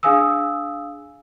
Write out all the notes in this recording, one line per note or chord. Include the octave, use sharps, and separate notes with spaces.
D4 G#4 F5 G#5 D#6 E6